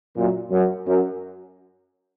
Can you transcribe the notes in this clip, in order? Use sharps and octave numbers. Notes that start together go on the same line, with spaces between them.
F#2 A#2
F#2
F#2